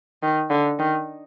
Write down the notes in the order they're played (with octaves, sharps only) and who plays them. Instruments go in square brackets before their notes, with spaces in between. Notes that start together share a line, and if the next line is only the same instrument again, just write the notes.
[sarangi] D#3
D3
D#3